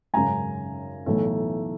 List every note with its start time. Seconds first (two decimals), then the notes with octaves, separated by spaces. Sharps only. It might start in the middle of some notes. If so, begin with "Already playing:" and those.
0.14 G#1 F#2 C#3 G#5 A#5
1.06 B1 A2 E3 A3